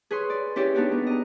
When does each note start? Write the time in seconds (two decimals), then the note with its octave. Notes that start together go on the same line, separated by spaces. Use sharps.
0.11 G#4 B4 C#5 C6
0.30 D5
0.56 C#4 E4 G4 C#5 D5
0.75 B3 D4 D#4 F#4 G4
0.92 B3
1.07 D#5 A#5